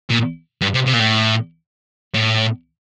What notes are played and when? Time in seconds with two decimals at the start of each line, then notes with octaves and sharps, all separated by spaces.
0.10 A#2
0.62 G2
0.74 C3
0.87 C3
0.93 A#2
1.00 A2
2.14 A2